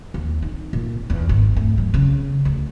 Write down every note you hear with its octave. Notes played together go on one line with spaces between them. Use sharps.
D#2
D#4
A#2
E2
G#1
A3
F#3
C#3
D2